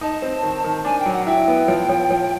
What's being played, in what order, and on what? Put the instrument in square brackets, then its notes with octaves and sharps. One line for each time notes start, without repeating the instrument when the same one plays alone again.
[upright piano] D#4 [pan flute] A5
[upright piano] C4
D#3
D#3
[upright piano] D4 [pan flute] G#5
[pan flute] G5
[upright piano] F#3
[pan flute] F#5
[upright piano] E4 [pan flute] G5
[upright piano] B3
F3
F3
F3